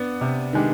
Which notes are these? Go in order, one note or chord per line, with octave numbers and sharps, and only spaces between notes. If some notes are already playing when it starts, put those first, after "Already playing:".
Already playing: B3 D4
C3
D#3 G#3 D4 G4